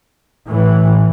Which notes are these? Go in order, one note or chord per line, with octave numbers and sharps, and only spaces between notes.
A2 E3